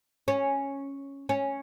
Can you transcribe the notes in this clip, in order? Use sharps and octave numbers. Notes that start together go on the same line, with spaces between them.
C#4
C#4